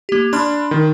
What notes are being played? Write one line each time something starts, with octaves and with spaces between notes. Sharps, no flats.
A#3 G4
D4 B5 C6 F6
D#3